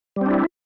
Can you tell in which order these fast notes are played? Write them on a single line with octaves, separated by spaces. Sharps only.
G3 C4 D4 E4